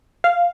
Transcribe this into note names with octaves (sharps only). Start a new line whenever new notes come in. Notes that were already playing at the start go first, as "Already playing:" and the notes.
F5